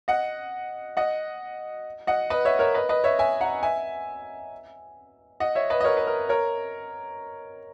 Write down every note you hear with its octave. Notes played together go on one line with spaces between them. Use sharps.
D#5 F#5
D#5 F#5
D#5 F#5
B4 D#5
C#5 E5
A#4 C#5
B4 D#5
B4 D#5
C#5 E5
E5 G#5
F#5 A#5
E5 G#5
D#5 F#5
C#5 E5
B4 D#5
D#5
A#4 C#5
B4
A#4
A#4 C#5